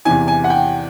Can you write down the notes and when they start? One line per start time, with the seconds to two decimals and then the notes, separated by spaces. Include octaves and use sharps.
0.05 E2 C3 E3 G#5
0.28 G#5
0.44 F#5
0.50 G5